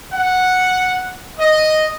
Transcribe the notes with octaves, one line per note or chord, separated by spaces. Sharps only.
F#5
D#5